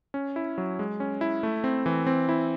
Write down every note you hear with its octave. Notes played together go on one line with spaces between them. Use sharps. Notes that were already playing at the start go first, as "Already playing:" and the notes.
C#4
E4
F#3
G#3
C#4
E4
A3
C4
E3
C4
E4